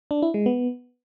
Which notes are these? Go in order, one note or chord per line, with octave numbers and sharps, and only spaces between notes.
D4
E4
G#3
B3